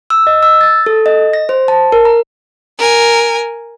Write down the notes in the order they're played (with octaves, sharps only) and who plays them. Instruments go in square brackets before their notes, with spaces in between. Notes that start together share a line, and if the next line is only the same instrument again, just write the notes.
[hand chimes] E6
D#5
E6
A6
A4
D#5
A#6
C5
A5
A#4
A#5
[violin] A#4 G#5